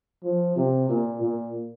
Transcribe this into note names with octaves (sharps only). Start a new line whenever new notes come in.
F3
C3
A#2
A#2